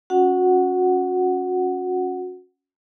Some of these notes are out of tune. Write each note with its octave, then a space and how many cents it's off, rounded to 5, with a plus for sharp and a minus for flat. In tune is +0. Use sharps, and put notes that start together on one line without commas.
C#4 +0 F#4 -25 F#5 +5